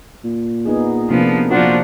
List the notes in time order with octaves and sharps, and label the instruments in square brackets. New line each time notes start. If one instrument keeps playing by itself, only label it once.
[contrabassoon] A#2
[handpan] B3 D#4 G#4
[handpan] C3 A#3 D4 [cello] F3 B3
[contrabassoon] A#2 [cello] F3 D4 [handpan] F#4 C5 F#5